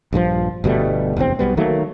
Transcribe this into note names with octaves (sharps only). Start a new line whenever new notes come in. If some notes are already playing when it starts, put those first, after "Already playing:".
A#1 G2 C#3 F3
G1 B2 G3 A3
F1 A#1 E2 C4
B1 B2 G3 B3
D#3 F#3 A3 A#3